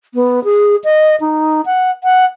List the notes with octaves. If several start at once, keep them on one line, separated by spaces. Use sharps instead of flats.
B3
G#4
D#5
D#4
F#5
F#5